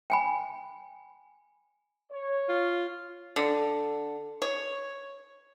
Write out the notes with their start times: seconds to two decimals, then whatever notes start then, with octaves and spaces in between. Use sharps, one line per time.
0.10 G5 G#5 B5
2.11 C#5
2.49 F4
3.36 D3
4.42 C#5